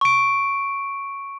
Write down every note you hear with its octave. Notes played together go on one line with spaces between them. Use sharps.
C#6 D7